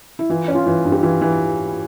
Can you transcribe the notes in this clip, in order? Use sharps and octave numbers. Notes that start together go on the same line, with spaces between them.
E4
E3 F4
C#4
F4
E3
G2
G4
E3 F4
E3